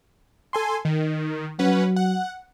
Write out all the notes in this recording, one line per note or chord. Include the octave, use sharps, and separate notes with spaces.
A4 G#5 C6
D#3
F#3 C#4 B4 F#5
F#5